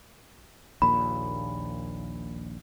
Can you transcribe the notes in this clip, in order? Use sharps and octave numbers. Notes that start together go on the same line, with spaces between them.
A#1 D#2 A#2 B5